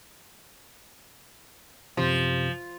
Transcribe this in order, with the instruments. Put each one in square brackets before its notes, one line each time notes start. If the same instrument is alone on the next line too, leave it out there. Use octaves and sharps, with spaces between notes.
[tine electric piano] F#2 C3 [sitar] F3